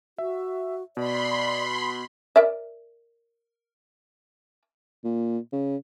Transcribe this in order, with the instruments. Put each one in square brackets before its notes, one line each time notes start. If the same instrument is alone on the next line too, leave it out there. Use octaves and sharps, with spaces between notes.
[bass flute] F#4 [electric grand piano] E5
[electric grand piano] B2 [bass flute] D5 [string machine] B5 C6
[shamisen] A#4 D5 E5
[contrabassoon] A#2
C#3